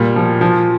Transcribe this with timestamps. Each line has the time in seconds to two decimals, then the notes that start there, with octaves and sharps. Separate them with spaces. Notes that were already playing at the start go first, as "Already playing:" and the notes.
Already playing: A#2 G3
0.16 F3
0.41 F3